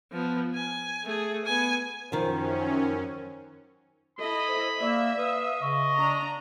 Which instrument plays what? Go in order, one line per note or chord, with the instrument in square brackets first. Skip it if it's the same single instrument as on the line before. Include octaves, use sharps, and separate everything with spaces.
[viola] F3 B3
G#5
A3 G#4
B3 G#5
[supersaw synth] F#2 C#4 [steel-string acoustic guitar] D#3 F3 [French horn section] A#4 C5
[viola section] E4 A4 D#5 [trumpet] B5
[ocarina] C5
[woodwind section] A#3 [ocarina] D5 [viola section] E5
[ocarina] B4 [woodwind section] F5 D#6
[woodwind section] C#3 [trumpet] D#5 [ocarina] C#6
[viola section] D4 A#5